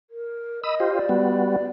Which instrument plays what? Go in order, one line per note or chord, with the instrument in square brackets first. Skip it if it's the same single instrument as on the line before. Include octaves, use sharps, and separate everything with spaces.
[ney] A#4
[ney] D#5 [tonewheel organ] B5 D#6 E6
[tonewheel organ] F4 G4 C5
[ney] D5
[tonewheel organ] G3 B3 F#4